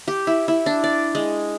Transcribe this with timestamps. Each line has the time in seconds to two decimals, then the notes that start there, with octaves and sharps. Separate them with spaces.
0.08 G4
0.27 E4
0.48 E4
0.66 D4
0.84 D5
1.15 G#3